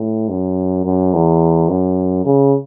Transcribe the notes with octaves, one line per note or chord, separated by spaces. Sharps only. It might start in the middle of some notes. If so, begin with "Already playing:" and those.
Already playing: A2
F#2
F#2
E2
F#2
C#3